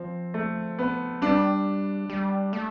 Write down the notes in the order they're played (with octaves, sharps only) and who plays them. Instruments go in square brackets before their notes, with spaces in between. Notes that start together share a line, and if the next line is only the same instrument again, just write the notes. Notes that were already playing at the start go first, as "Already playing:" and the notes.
Already playing: [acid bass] F3 [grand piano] C4
[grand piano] A3
B3
[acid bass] G3 [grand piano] D4
[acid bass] G3
A3